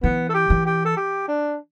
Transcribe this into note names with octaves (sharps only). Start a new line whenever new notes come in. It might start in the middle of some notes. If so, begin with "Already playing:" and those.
E3 B3
A4
G4
E3
G4
A4
G4
D4